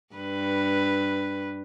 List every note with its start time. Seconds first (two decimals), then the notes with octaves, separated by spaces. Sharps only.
0.15 G2 B4